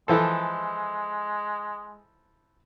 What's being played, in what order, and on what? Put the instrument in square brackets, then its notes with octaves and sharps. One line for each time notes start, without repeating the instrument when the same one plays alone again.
[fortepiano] E3 F3 A4 [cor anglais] G#3